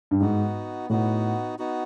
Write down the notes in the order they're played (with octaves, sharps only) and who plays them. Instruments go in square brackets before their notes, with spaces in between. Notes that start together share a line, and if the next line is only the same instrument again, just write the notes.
[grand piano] G2
[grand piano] G#2 [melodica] B3 D#4 F#4
[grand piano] A2 [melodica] B3 D#4 F#4
[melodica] B3 D#4 F#4